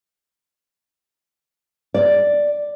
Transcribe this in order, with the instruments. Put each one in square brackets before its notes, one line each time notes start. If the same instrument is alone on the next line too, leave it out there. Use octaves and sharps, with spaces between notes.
[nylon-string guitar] D5